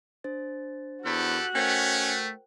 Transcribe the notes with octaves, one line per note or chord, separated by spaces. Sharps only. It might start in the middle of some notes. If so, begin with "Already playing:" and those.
D4 C5 A6
E2 F#4 G4 A4 F#6
A3 C#4 A#4 C5 G5